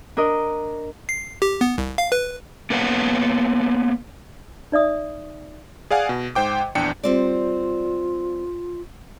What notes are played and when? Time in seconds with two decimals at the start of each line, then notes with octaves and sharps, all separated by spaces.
0.17 D4 A#4 D#5
1.09 C7
1.42 G4
1.61 B3
1.78 C2
1.98 F5
2.12 B4
2.70 A#3 B3 B4 C#5 F5 F#5
4.72 D#4 D5 E5 D#6
5.91 G#4 D5 F5 F#5 G#5
6.09 B2
6.35 G#2 C5 G5 D6
6.75 A#1 E2 D4 G5 C#7
7.04 G3 C4 F4 D5